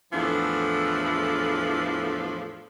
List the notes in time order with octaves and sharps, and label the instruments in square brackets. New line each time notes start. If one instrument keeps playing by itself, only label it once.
[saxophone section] E2 A2 E3 F3 D4 A4